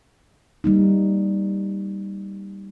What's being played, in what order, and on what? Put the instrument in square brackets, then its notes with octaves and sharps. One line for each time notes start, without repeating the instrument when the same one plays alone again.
[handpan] G3 A#3 D#4